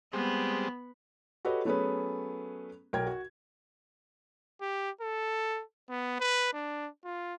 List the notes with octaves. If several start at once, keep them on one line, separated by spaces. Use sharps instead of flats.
G3 G#3 B3 C4
F#4 G4 A4 B4 C#5 D#5
F#3 A3 B3 C#4 G#4 B4
B1 A#4 G5 G#6
F#4
G4
A4
B3
B4
D4
F4